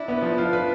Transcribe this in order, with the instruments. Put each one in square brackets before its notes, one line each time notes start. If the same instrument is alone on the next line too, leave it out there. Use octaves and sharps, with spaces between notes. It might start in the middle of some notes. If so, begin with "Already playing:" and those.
Already playing: [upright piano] D4 [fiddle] E4
[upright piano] B3
F3
[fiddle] D4 [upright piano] F4
[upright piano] B4